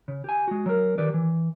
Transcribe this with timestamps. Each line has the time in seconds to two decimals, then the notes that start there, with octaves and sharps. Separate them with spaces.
0.08 C#3
0.24 G4 G#5
0.48 G#3 F#4
0.66 F#3 A#4
0.98 D#3 G4 B4 D5
1.14 E3